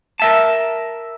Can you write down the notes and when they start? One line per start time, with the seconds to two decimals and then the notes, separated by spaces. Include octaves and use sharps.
0.20 A#4 E5 A5